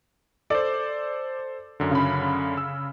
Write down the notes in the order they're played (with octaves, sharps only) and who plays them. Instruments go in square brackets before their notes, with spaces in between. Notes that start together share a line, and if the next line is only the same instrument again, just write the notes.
[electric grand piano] A4 C5 [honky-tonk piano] D5
[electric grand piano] F#2 D3
[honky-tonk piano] C#3 B5
[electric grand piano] E6